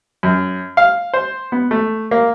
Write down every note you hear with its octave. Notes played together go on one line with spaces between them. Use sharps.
F#2
F5
C5
B3
A3
A#3